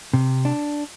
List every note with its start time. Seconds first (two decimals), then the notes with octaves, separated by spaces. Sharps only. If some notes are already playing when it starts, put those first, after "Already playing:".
0.14 C3
0.45 D4